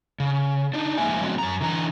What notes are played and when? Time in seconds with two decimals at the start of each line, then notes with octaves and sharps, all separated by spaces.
0.20 C#3
0.74 D4 D#4
0.97 F3 G#3 A#3 E5 G#5
1.21 F3 F#3 G#3 B3 C4 F#4
1.38 F#2 A#5
1.61 D3 E3 A#5